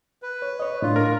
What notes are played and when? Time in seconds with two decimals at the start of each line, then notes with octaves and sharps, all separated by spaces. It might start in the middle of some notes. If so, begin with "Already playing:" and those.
0.22 B4
0.42 C#5
0.60 C#5 D#5
0.82 A2 D4 F4
0.96 A#4